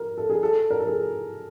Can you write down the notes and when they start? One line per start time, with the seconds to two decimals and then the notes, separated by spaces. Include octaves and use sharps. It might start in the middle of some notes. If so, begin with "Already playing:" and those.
Already playing: A#4
0.18 A4
0.30 G#4
0.43 A4
0.71 A#4
0.80 A4
0.87 G#4